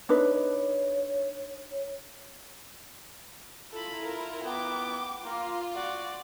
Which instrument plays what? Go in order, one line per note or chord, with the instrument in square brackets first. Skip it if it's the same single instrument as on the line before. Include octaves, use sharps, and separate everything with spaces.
[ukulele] D4 D#4 B4 [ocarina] C#5
[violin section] E4 F4 A#5 [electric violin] A4 B5
[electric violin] A4 A#4
[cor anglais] B3 [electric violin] G5 D6
[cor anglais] A#3 [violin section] F4
[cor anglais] F#4 [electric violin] D5